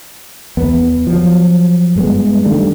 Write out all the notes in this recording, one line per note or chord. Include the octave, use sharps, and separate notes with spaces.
E2 B3
F3 F#3
G2 G#3 B3
D#3 G3 A3 D4